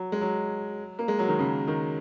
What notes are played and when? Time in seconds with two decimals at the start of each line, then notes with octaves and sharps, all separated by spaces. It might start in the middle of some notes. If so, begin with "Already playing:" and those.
Already playing: F#3
0.12 G#3
0.21 F#3
0.99 A#3
1.08 G#3
1.19 F#3
1.28 D#3
1.39 C#3
1.68 D#3